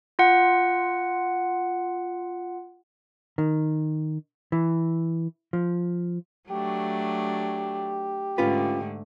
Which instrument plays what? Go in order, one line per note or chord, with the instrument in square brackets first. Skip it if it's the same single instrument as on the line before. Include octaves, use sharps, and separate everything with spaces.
[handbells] F4 F#5
[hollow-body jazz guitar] D#3
E3
F3
[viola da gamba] F#3 A3 D4 [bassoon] G4
[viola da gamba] G#2 D3 A3 [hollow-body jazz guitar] C#4 F4 B4